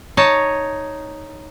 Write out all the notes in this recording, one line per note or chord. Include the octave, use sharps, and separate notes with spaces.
D#4 C#5 A5